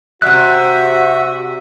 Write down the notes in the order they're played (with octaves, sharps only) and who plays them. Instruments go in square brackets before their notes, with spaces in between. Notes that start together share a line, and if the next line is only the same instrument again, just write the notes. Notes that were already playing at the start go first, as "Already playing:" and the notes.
[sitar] C3 G3 [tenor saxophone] F#4 [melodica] E5 [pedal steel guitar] F#6